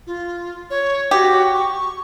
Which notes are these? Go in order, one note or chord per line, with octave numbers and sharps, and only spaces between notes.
F4
C#5
F#4 G4
C#6